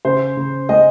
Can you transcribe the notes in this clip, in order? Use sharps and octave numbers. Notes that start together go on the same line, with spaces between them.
C#3 C5
C#3
G#3 D#5